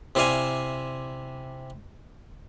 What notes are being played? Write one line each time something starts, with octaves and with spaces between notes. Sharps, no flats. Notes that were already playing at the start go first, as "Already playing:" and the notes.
C3 E4 C5 D5 F5 G#5